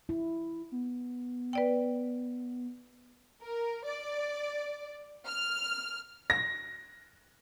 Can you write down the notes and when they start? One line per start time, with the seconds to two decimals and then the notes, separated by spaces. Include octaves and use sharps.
0.09 E4
0.72 B3
1.53 B4 D5 G5
3.42 A#4
3.85 D5
5.27 F6
6.30 A#6